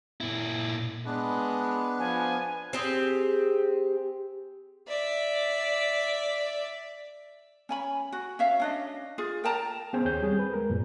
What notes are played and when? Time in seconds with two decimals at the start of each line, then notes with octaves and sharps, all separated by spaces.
0.21 A#2 E4
1.06 G#3 B3 D4 B4
1.99 F3 G#5
2.73 C4 G4 G#4
4.88 D5 E5
7.69 C#4 G#5 B5
8.12 F#4
8.39 C#4 E5 F5
8.60 C#4 D4 D#5
9.18 F4 G#4
9.44 A#4 G5 A5 A#5
9.93 B3 C#4 G#4 C5 G5 G#5
10.05 D#2 G#4 C#5 G6
10.23 G3 C4 G#4
10.39 B4
10.53 G#3 A#4
10.69 F#2 A#2